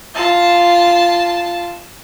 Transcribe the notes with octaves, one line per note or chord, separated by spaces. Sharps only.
F4 A5